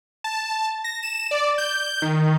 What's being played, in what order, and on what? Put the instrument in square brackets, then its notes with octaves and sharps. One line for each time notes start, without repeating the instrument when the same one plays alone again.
[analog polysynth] A5
A#6
E7
D5
G6
D#3